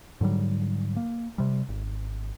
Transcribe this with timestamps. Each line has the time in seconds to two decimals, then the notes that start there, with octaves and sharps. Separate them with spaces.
0.21 G#2 D3 F#3 G3
0.96 A#3
1.38 C3 G3
1.69 G#1